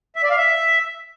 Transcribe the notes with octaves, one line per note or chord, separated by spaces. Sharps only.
E5
D5
F5
E5